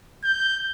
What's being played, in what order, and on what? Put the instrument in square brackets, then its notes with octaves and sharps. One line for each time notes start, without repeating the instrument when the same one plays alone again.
[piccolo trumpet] G6